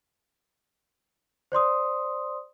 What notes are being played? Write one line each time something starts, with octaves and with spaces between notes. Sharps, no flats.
C5 D5 C6 D#6